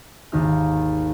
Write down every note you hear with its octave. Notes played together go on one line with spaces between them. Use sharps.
G#1 D#2 D#4 G4 F6